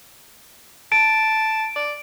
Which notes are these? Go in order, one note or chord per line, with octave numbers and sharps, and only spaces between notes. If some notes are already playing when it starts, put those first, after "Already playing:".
A5 D7
D5